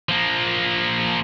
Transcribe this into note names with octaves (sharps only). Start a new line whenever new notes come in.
F3 A#3